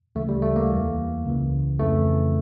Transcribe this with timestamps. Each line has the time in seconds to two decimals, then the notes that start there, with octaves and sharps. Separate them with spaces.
0.15 D2 C#3 E3 A3
0.29 G3
0.42 A3
0.56 A#3
0.70 E2 E3
1.25 C#2 C#3 E3
1.79 F2 C#3 E3 A3